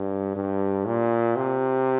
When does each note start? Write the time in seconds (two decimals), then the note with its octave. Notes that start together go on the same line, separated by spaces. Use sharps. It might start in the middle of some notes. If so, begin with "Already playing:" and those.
Already playing: G2
0.36 G2
0.86 A#2
1.36 C3